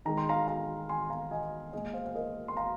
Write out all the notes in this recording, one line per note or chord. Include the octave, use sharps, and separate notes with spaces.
D#3 G#3 A#5
C6
F5 A#5
F5 A#5
G#5 C6
F5 A#5
D#5 G#5
A#2 G#3 D#5 G#5
C5 F5
F5
A#4 D#5
C6
F5 A#5